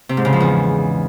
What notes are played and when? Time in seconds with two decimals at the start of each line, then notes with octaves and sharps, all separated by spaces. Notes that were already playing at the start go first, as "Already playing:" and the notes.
0.09 C3
0.17 G#2
0.25 C#3
0.33 F3
0.40 E2